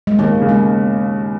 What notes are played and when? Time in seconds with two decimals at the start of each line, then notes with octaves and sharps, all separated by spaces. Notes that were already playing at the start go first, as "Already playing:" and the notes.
0.07 G#3
0.19 D#2 A#3
0.42 C#3
0.49 G#3